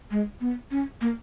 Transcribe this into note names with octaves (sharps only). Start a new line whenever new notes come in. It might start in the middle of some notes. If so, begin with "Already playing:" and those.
G#3
B3
C#4
A#3